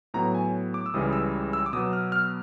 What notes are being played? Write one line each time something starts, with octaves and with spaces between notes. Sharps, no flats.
A2 F#3 B3 A#5
G#5
D6
E6
C#2 C#3 E3 G3 D#6
E6
E6
D6
B2 F#3 B3 D#6
F6
F6